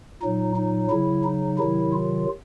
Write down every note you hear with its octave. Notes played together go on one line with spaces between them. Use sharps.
A#2 F#3 D#4
D#4
C#3 F#3 E4
D#4
C3 D#3 F#3 E4
F4